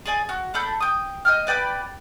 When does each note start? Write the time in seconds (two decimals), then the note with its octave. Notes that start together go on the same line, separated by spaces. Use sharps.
0.05 G#4 D5 G#5
0.29 F#4
0.54 D4 A4 B5 G6
0.80 G5 D#6
1.25 D#5 G5 F6
1.47 B4 D5 G5 B5